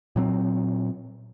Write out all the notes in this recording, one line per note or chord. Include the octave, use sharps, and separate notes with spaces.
A#2 F#3 C4